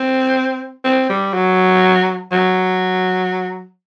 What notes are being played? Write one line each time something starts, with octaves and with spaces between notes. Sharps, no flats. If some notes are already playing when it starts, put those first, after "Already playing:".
Already playing: C4
C4
G3
F#3
F#3